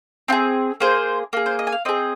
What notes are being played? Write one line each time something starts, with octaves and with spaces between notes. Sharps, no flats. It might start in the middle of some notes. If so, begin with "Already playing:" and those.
C4 F4 G#4
A#3 G#4 C5
A#3 G#4
C5
D#5
G#5
F5
C4 G#4 D#5